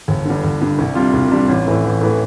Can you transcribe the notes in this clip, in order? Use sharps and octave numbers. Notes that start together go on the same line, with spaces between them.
G1
G2 D3
G1
G2 D3
C2
C3 G3 D4 F4
C2
C3 G3 D4 F4
A1
A2 E3 A3
A1
A2 E3 A3